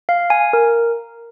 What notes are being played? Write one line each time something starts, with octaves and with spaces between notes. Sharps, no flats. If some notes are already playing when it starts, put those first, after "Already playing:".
F5
G#5
A#4